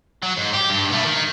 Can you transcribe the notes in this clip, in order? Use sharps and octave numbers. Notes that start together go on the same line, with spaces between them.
F#3
G#2
G4
G2
B2 A3
D#3